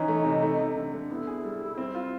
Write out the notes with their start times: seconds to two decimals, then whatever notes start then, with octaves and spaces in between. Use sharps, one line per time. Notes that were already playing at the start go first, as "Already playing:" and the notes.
Already playing: E3 C#4 D#4
0.08 A3
0.25 C3
0.42 A3
0.59 A3
0.76 D3
0.93 D3
1.10 B3 E4
1.27 G#4
1.44 G3
1.61 G3
1.78 C4
1.95 F4